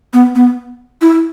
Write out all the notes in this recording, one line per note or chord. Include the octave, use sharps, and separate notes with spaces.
B3
B3
E4